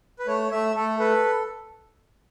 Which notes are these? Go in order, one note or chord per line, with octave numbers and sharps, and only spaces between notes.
B4
A3 C#5
A3 E5
A3 A4
A4 B4